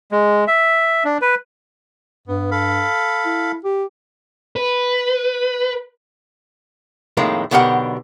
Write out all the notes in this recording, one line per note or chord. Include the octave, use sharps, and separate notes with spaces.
G#3
E5
D4
B4
G2 B3
A4 F5 B5
E4
G4
B4
F2 A2 D#3 G#3 A#3
B1 B2 D3 G4 A#4 F#5